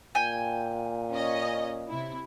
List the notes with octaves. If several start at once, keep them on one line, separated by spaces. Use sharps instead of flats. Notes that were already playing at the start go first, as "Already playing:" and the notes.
A#2 G5 G#5
C#4 D#5
C3 E4